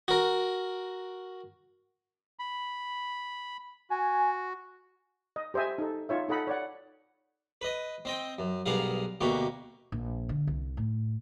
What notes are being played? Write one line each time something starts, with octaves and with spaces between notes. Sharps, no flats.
F#4 A#4
B5
F#4 G#5
D#5
G4 C5 D#5 E5 G#5
D#4 A4
D#4 F4 C#5 E5
D#4 A4 D#5 F#5 B5
C#5 D5 F#5
B4 D#5
C4 D#5 G5
F#2
B1 G2 G#4 A#4 F5 F#5
D2 B2 A#3 G4 C#6
A#1
D3
C2
A2